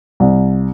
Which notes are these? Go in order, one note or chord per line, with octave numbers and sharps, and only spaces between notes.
C2